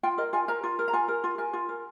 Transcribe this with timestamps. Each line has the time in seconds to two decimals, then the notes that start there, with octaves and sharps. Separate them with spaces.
0.03 F4 G5
0.18 A#4 D#5
0.33 F4 G#5
0.48 A#4 A#5
0.63 F4
0.79 A#4
0.88 A#5
0.93 F4 G#5
1.08 A#4
1.24 F4
1.38 A#4 G#5
1.53 F4
1.69 A#4